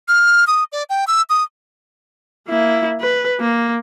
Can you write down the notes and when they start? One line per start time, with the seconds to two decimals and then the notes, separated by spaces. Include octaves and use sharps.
0.08 F6
0.47 D#6
0.72 D5
0.90 G5
1.07 E6
1.30 D#6
2.48 A#3 E4
3.01 B4
3.40 A#3